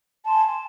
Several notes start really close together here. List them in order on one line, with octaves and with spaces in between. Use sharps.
A5 C6 G#5